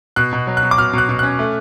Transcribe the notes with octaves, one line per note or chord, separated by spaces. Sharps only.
B2 F#6
B2
F#3
F#6
B2
D6
B2 F6
B2 F#6
B2
C#4 F#6
A3